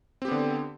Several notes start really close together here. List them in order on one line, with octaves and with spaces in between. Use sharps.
C4 G4 B3 D3